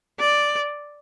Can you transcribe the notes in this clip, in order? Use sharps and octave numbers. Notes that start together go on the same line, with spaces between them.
D5